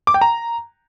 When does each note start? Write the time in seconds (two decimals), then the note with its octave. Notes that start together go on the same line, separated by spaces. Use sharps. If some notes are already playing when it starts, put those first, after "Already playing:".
0.07 D6
0.14 G5
0.21 A#5